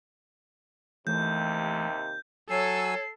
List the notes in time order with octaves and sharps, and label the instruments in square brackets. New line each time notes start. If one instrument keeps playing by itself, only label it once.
[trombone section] D#2 C3 [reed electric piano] E3 A3 [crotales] G6
[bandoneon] F#3 G#5 E6 [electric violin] A4 [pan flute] C#5 [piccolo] C7